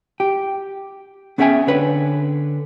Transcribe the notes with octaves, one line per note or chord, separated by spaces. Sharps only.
G4
B3 C#4 G#4 E5 G5 G#5
D3 B4 C#5